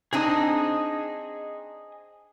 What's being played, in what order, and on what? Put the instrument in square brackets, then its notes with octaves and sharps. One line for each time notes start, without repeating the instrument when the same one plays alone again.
[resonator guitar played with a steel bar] C4 D4 D#4 [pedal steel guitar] G#4 D#5 D#6